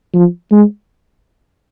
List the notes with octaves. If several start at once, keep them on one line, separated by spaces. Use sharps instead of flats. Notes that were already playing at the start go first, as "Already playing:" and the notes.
F3
G#3